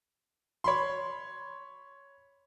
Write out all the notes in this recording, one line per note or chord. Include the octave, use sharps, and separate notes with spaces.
C#5 B5 C6